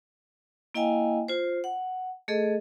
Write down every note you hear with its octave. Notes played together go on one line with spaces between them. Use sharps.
A#3 E4 D#5 F5 G5 G#5
F4 C5
F#5
A3 G#4 A4 D#5